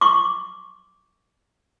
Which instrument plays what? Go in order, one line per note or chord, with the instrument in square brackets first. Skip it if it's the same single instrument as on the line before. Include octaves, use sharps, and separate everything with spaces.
[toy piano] C#6 D6